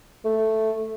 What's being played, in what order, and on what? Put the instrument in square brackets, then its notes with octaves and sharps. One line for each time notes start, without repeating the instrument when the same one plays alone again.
[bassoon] A3